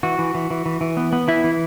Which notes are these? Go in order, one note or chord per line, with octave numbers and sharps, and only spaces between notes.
E3 F#4
E3
E3
E3
E3
E3
B3
B3
E3 E4
E3